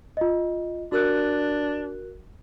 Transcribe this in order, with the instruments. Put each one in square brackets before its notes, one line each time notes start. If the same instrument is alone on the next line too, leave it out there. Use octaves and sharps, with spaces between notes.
[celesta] F4 D#5
[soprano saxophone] D4 [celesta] F#4 A#4 F#6